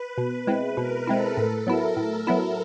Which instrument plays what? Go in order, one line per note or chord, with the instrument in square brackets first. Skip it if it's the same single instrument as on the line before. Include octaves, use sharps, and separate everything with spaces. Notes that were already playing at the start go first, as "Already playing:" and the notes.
Already playing: [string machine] B4
[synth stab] B2
G#3 C4 E4
[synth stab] B2 [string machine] A#4
[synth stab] G#3 C4 E4 [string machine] A4
[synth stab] A2 [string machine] A4
[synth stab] F#3 B3 E4 [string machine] A#4
[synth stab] A2 [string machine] A#4
[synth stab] F#3 B3 E4